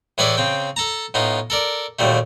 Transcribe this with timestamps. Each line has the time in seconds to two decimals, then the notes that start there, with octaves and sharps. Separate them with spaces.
0.18 A2 E3 G#4 A4 D5 E5
0.37 C#3 C4 G5
0.76 A4 A5 A#5
1.14 A2 B3 D#4 F4
1.50 A4 A#4 D5
1.99 D#2 A#2 F#3 G3 A3